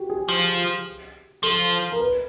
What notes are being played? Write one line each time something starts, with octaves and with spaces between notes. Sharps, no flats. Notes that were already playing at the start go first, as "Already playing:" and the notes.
Already playing: F#4 G4
G#4
F3
F3 A4
A#4
B4